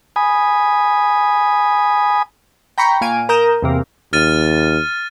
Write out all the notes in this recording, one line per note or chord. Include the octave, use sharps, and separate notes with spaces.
G#5 B5 D#6
G5 A#5 B5 C#6
A#2 F5 G#5 D7 D#7
A#4 A#5 D#6 G6 E7
E2 C3 A#3
D#2 F6 A6 D#7